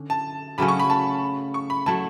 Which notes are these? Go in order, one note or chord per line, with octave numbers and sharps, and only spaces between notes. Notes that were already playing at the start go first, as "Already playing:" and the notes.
Already playing: D3 C#4
A5
C#3 F#3 A3 C#4 B5
C#6
B5
A5
C#6
B5
F#3 A3 E4 A5